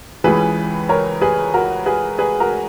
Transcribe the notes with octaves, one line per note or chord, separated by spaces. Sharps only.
C#2 C#3 E3 G#4 B4
A#4 C#5
G#4 B4
F#4 A#4
G#4 B4
G#4 B4
F#4 A#4